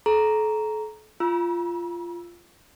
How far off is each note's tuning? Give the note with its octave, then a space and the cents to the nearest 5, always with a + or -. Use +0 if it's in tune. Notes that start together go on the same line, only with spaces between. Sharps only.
A4 -35 A#5 +0 C#6 +30
F4 -15 A#5 +45 E6 +0